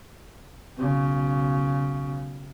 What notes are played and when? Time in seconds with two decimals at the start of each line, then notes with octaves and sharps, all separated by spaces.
0.77 B1 C#3